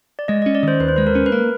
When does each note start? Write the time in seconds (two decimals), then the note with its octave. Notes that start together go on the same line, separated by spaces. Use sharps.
0.19 D5
0.28 G#3 D#5
0.42 D#5
0.46 C#4
0.55 D5
0.63 D#3 C5
0.80 D#2 B4
0.88 C5
0.96 G#3 B4
1.07 A#4
1.15 C#4
1.26 B4
1.32 A#3 A#4